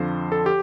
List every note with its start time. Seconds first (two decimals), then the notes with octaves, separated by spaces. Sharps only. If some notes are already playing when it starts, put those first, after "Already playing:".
Already playing: F2 D3 F3 C5
0.32 A4
0.46 G4